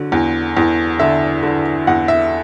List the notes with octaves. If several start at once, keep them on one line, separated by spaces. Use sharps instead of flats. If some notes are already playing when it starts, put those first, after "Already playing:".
Already playing: D3 F#3
E2
E2
D3 E5
D3
E2 F#5
E5